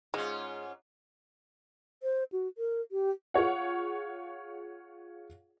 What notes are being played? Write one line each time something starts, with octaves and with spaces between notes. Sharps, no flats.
G#2 G#3 C#4 F4
C5
F#4
A#4
G4
F4 G#4 C#5 F#5